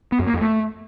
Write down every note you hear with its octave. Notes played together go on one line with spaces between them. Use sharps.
B3
F#2
A#3
F2
A3